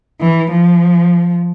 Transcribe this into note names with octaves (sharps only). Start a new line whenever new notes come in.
E3
F3